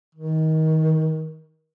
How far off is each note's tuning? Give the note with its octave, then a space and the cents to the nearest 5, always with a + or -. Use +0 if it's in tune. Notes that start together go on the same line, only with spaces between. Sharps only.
D#3 +25